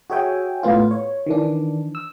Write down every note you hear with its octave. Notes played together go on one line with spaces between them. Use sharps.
F#4 G#4 C#5 E5 G5 G#5
A2 B3 F4
C#5
D#3 E3 D4
E6